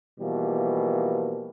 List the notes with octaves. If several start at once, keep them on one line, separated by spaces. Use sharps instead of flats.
B2 E3 F3 G3 A#3